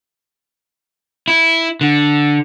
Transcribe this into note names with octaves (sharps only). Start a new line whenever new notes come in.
E4
D3